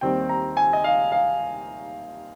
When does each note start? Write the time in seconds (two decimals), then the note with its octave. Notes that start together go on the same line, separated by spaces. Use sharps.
0.01 D#2 D#3 G3 C4 G5
0.29 A#5
0.57 G#5
0.73 D#5
0.84 F5
1.12 F5